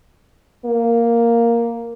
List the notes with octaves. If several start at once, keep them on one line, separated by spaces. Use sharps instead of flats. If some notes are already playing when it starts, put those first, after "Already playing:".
A#3